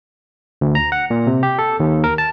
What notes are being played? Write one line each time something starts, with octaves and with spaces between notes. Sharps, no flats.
D2
A#5
F#5
A#2
C3
G4
A4
D#2
A#4
A5